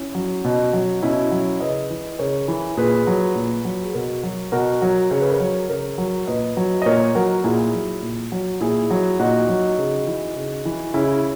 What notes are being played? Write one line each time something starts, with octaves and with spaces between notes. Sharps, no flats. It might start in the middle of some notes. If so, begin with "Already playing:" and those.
Already playing: C#4 E4
F#3
B2
F#3
B2 C#4 E4
F#3
C#3 B4 D#5
E3
C#3 A#4 C#5
E3
A#2 G#4 B4
F#3
A#2
F#3
G#4
B2 F#4 A#4
F#3
B2 F#4 A#4
F#3
C#3 C#5
B4
A#4 C#5
F#3
C#3 A#4 C#5
F#3
A#2 B4 D#5
F#3
D#5
A#2 A#4 C#5
F#3 F#4 A#4
A#2 E4 G#4
F#3
A#2
F#3
A#2 E4 G#4
F#3
A#2 D#4 F#4
F#3
C#3
E3
C#3
E3
C#3 C#4 E4